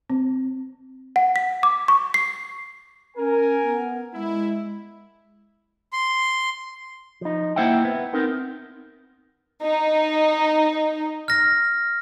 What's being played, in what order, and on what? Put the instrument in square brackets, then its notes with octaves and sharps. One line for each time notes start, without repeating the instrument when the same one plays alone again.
[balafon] C4
[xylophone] F#5
B6
D6
C#6
C7
[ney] C#4 [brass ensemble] A#4 G#5
[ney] B3
[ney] G#3 [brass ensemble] E4
[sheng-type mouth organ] C6
[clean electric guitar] F3 D#4
A#3 E4 C5 E5 F#5 G5
B3
B3 C4 D#4 A#4
[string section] D#4
[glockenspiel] F6 A#6